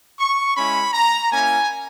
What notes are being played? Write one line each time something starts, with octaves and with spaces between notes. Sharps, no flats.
C#6
G#3 C#4 E4 B5
A#5
A#3 C#4 E4 G#5